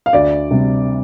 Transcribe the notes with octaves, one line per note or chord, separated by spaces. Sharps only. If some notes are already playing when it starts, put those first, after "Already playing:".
F5
D2 D5
C3 G3